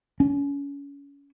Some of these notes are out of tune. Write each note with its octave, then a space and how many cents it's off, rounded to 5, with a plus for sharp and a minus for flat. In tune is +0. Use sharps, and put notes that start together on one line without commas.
C#4 +30